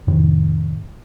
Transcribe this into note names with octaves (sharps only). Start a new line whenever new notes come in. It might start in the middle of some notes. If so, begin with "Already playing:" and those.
F2 A2 C3 D#3